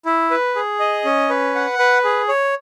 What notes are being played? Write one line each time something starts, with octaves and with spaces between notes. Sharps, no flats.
E4
B4
G#4
D#5
C#4
B4
F#5
B4
G#4
C#5